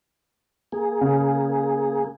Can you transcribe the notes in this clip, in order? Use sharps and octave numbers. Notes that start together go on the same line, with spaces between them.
A#3 G#4
C#3